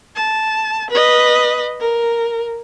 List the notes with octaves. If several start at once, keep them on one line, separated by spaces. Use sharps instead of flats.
A5
B4 D#5
A#4